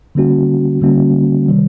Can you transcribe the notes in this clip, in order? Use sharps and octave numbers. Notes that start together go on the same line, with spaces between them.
D3 G3 A#3 C#4 F#4
D3 G3 A#3 C#4 F#4
C3 D#3 G3